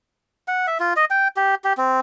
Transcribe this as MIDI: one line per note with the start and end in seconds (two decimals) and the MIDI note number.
0.48 0.66 78
0.67 0.78 76
0.80 0.93 65
0.96 1.05 75
1.10 1.28 79
1.36 1.55 67
1.64 1.73 67
1.77 2.00 60